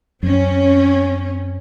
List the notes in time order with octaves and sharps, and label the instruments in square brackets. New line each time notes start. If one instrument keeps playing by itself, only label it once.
[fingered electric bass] F#2 [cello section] C4 C#4